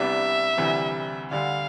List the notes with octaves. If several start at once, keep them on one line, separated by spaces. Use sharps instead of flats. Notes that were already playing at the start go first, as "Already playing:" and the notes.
Already playing: C2 C3 G3 B3 D4 E5
D2 C3 E3 G3
D2 D3 G3 F5